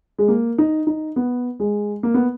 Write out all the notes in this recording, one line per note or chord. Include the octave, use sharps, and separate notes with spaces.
G#3
A#3
D#4
D#4
B3
G#3
A#3
B3